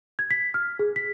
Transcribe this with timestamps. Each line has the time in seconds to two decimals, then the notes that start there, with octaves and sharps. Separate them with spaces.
0.19 G#6
0.31 B6
0.54 F6
0.79 G#4
0.96 B6